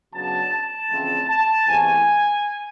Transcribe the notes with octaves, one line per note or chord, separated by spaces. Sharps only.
C#3 F#3 B3 D4 A5
A5
F2 C#3 E3 A3 C4
A5
E2 C3 E3 A3 G#5